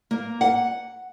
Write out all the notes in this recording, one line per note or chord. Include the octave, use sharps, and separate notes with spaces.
A#3
F#5